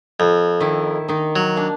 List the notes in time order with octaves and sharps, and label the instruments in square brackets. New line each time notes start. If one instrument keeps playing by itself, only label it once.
[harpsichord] F2
[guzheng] D#3 E4
D#3 A#3 D#4
[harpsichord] F#3
[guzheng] A#3 D4